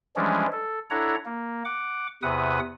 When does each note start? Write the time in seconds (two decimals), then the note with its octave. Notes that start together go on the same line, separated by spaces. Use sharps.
0.16 E3 F3 G3 G#3 C#4 D4
0.52 A4
0.90 D4 E4 A4 C#5 F#5 A#5
1.26 A#3
1.65 F#5 D6
2.23 E2 C3 B4 F#5 D#6